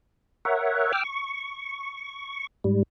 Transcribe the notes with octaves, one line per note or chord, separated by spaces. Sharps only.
A#4 C#5 E5 F#5
G5 D6 E6 F6
C#6
G#2 G3